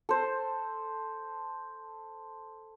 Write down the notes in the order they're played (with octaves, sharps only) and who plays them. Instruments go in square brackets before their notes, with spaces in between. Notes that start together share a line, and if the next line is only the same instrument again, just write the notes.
[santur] A4 C5